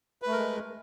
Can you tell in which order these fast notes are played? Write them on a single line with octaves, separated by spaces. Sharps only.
B4 A3 A#4 G#3